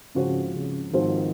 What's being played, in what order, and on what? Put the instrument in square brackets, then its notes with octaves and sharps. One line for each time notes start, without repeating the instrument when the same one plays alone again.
[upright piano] G#2 F3 C4 F#4 C5 [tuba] C#3
[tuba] C#3
[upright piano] G#2 F3 C4 F#4 C5 [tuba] D#3